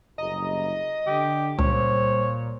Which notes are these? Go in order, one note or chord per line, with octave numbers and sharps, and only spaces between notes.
F#1 C2 D#5 A#5
D3 G4
C#2 A#2 G3 C5 C#5